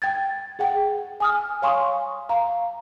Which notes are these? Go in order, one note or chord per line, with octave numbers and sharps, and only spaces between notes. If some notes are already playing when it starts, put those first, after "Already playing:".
G5 G#6 A6
G#4 F#5 G5
G#5 D#6 F6
C#5 F5 G#5 C6 C#6 D#6
F5 A#5